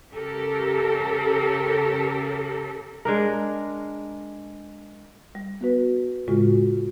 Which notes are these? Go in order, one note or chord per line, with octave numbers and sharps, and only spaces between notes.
C#3 G4 A4 A#4
G#3 D4 A#4
G3
B3 F#4 B4
A2 C#3 G#3 F4 F#4